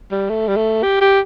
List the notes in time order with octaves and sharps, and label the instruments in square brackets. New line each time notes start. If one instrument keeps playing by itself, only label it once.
[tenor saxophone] G3
A3
G3
A3
G4
G4